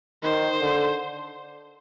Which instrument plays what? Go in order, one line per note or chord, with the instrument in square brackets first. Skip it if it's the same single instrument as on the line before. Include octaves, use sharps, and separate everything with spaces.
[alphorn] D#3 [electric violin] C5
[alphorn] D3